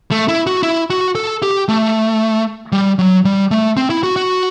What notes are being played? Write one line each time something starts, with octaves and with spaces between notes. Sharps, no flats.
A3
E4
F#4
E4
F#4
A4
G4
A3
G3
F#3
G3
A3
C4
E4
F#4
F#4